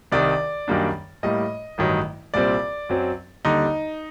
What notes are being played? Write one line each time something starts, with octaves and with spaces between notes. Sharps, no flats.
C2 C3 D#3 D5
F#2 D#3 G3 A#3 D4
A2 G3 A#3 D#5
A1 G2 D#3 F#3
C2 A#2 G3 C4 D5
F#2 F#3 C4
D#2 D3 G3 D#4